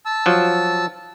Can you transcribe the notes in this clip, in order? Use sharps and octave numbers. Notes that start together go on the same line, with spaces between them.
A5 E6
F3 F#3